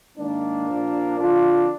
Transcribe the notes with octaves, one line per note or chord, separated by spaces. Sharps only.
G#2 D#3 A#3 D4
A#2 F3
F2 D3 F3 D4 F4